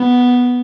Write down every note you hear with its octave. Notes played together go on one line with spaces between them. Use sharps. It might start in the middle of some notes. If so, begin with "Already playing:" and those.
Already playing: B3